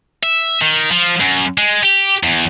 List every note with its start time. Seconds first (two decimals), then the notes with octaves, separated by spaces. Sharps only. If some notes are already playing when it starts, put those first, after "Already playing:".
0.23 E5
0.62 D#3
0.92 F3
1.21 F#2
1.58 G#3
1.83 G4
2.23 E2